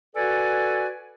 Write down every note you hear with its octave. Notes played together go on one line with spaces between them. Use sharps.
F#4 A4 B4 D5 G#5